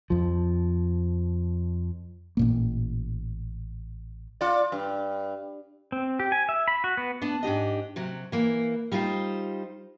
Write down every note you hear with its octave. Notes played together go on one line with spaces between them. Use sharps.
F2 F3
A1 A#2 A#3
F4 D5
G2
C4
G4
G#5
E5
B5
F#4
B3
B3 D4
G#2 D4 G4 D#5
C3 F#3
E3 A#3
G3 D#4 F4 A#4 C5